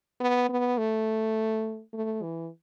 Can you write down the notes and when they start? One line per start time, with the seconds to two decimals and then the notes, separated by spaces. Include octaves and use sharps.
0.20 B3
0.49 B3
0.78 A3
1.94 A3
2.22 E3